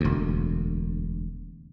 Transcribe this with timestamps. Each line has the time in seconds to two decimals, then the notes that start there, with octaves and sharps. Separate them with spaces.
0.01 E1 D2